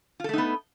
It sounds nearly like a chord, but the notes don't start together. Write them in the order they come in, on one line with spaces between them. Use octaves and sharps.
F4 A4 A3 D#4 B3